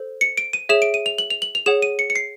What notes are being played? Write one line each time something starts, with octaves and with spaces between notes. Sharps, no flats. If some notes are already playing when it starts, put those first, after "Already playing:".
Already playing: A4 C5
C#7
D7
D#7
G#4 C#5 E5 E7
D7
D#7
F7
F#7
F7
F#7
F7
G#4 C#5 F#5 E7
D#7
C#7
C#7
C7